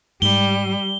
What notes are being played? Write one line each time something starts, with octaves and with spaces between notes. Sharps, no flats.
G#2 G3 G7